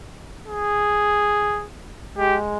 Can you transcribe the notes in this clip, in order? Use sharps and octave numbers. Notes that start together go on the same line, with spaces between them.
G#4
G#3 G4